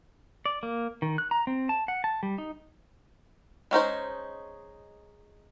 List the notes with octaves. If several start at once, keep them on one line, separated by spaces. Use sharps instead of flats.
D5
A#3
D#3
F#6
A#5
C4
A5
F#5
A5
G3
D#4
G#3 C#4 D#4 C5